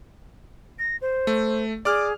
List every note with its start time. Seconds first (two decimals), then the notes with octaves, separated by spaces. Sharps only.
0.79 A#6
1.01 C5
1.27 A3
1.85 G#4 D5 D6 F6